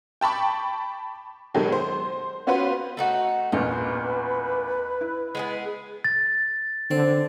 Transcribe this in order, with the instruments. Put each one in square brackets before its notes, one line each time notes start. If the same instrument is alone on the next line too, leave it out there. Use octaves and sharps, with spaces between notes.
[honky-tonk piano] G5 A5 B5 C#6 D6
B2 D#3 F#3 G#3 G4 A4
C5
B3 C#4 F4 F#4 B4 C5
[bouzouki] A3 D#4 F#4
[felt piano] A1 E2 A#2 [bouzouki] F4 [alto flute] B4
[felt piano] E4
[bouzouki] G#3 B3 G#4
[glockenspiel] A6
[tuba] D3 [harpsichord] C4